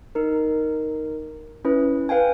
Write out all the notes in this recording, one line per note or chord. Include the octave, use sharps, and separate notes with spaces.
D#4 A#4
C#4 E4 B4
B4 F5 G5 G#5